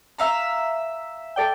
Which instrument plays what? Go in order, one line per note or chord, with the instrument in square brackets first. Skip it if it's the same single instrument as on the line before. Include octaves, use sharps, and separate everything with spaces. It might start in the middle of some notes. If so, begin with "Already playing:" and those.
[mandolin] E5 F5 A#5
[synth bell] A4 D5 G5